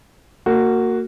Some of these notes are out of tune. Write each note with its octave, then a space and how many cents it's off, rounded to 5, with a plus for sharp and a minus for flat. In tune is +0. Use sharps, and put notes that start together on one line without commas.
A#3 -25 F#4 +0